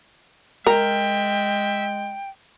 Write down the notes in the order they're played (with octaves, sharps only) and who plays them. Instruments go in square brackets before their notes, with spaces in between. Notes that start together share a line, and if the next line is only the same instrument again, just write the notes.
[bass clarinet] G#3 [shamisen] A#4 [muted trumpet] E5 [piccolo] G5